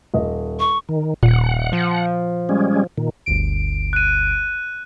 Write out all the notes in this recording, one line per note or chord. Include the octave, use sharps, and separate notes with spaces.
D#1 D#5
C#6
D#3
D#1 A#2 F#5
F3
G3 G#3 C#4
A#2 D#3
G1 D2 D7
F#6 D#7